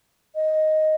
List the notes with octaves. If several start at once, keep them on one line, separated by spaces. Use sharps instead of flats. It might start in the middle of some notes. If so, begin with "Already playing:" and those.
D#5